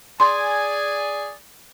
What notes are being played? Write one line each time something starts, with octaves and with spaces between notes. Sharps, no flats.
G#4 D5 G#5 C6